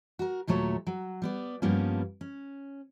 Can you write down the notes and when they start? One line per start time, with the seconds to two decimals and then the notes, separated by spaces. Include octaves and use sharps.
0.19 F#4 A#4
0.47 D#2 A#2 F#3 A3 C#5
0.87 F#3
1.22 G3 B3 D5
1.62 G2 F3 G3 A#3 B3 C#4
2.21 C#4